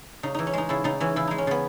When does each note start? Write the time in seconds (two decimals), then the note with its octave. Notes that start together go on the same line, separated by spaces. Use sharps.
0.23 C#3 D#4
0.34 E3 D#4
0.47 C#4
0.53 G#3 D#4
0.69 C#3 E4
0.84 C#3 D#4
1.00 E3 C#4
1.16 C#3 E4
1.28 G#3 D#4
1.38 C#4
1.47 C#3 B3